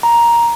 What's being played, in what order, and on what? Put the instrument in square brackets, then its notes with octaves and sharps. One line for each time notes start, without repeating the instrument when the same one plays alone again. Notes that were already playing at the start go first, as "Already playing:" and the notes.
[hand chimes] A#5